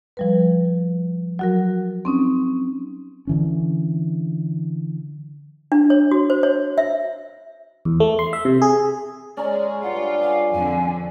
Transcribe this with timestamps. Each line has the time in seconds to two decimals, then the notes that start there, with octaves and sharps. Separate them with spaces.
0.17 F3 G3 B4
1.39 F#3 F#4 A#4
2.05 C4 C#4 D#4
3.27 D3 E3 C#4
5.72 D4
5.90 C#5
6.11 F#4
6.30 C5
6.43 C#5
6.78 E5
7.85 E2
8.00 A3
8.19 C6
8.33 E5
8.45 C3
8.62 G#4
9.37 G#3 C#4 D5 A#5
9.83 G2 F4 D5 F#5
10.21 G#4 F5
10.53 F2 D3 G#5